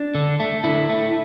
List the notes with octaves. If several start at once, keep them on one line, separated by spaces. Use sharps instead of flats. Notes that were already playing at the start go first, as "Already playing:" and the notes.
Already playing: D4
D3
A3
D3 E4
A3